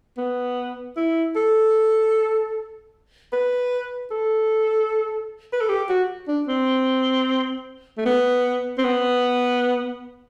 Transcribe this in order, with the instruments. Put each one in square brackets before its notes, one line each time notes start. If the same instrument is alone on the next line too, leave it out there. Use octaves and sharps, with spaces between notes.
[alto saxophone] B3
E4
A4
B4
A4
B4
A4
G4
F#4
D4
C4
A3
B3
C4
B3